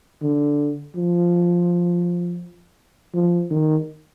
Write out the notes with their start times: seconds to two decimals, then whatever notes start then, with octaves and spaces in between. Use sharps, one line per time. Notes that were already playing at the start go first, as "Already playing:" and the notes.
0.22 D3
0.96 F3
3.14 F3
3.51 D#3